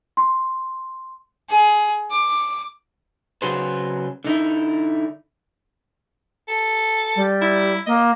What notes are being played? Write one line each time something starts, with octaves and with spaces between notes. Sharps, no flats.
C6
G#4
D6
C#3 F#3 G#4 B4 C5
D3 D#4 E4
A4
G3
E4
A#3 D#5